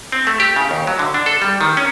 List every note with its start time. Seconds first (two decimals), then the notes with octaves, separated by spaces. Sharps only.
0.12 C4
0.27 A3
0.40 G4
0.56 C#3
0.71 D#2
0.87 F#3
0.99 D3
1.14 D4
1.26 A4
1.42 G3
1.61 D#3
1.77 C#4